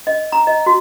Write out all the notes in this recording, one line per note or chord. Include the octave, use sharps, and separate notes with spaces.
D#5
A#5
D#5
F#4